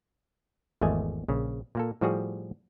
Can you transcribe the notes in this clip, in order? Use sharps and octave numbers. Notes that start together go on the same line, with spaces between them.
G#1 E2 A3 D#5 G#5
A#1 C#3
A#2 A#3 A4
A2 F3 G3 F#4 G#4